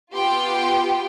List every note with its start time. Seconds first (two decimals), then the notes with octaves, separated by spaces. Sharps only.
0.15 B3 F4 G4 G5 C6